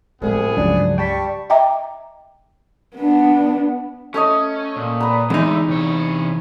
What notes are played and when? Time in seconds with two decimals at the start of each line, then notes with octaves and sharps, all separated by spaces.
0.22 C2 A2 F3 G#3 B3 G#4
0.57 C#2 G2 C#3 F3 F#3 D4
0.98 G3 G5 A5 C#6 B6
1.50 D#5 E5 G5 A#5 D6
2.96 B3 D4
4.14 A3 C#4 C#5 D#5
4.76 A#2
5.00 B4 A#5
5.30 E2 D3 G#3 A3 D#4
5.68 C3 C#5